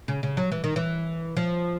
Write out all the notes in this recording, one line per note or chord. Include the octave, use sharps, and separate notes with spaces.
C#3
C#3
F#3
E3
D#3
E3
F3